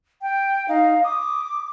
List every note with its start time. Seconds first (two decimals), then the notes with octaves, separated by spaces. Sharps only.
0.22 G5
0.69 D#4 F5
1.04 D6 D#6